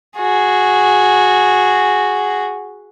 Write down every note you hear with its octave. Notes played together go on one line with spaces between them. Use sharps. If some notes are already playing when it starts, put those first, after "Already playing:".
F#4 G#4